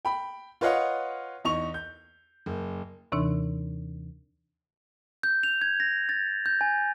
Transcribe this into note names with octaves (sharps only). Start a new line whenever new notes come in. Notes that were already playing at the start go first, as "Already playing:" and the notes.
G5 B5
F4 B4 C#5 D#5 F5 F#5
E2 D#4 C#6 F7
G6
F#1
D#2 C3 E3 D4 D#4
G6
F7
G#6
A#6
A6
G6
G#5